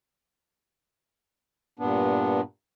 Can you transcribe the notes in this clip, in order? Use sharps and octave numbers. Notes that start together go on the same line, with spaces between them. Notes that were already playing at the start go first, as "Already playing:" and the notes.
G2 A#2 B3 D4